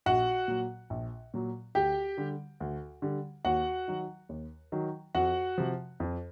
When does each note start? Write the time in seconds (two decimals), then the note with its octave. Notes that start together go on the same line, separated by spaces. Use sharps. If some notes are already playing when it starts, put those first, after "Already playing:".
0.06 A#1 F#4 F#5
0.48 A#2 F#3
0.90 A#1
1.34 A#2 F#3
1.75 D2 G4 G5
2.18 D3 G3
2.60 D2
3.02 D3 G3
3.45 D#2 F#4 F#5
3.88 D#3 F#3
4.29 D#2
4.72 D#3 F#3
5.15 F2 F#4 F#5
5.58 C3 F3
6.00 F2